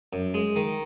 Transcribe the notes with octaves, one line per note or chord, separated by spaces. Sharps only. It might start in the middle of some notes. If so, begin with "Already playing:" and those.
F#2
G#3
D#3